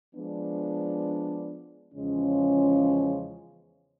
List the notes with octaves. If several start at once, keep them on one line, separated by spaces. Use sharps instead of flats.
F3 G#3 B3 D4
E2 C#3 F3 G#3 C#4